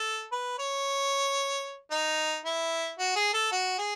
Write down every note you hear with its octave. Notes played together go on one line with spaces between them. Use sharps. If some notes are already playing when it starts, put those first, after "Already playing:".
Already playing: A4
B4
C#5
D#4
E4
F#4
G#4
A4
F#4
G#4